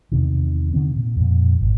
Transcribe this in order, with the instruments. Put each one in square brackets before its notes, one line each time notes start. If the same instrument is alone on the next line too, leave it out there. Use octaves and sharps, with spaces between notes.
[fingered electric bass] E2 C3 D#3
D3 D#3 C4
A#2
F2 A#2
G#1